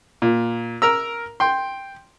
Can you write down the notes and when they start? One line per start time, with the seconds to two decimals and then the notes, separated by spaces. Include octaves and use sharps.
0.22 A#2
0.82 A#4 A#5 E6
1.40 G5 C6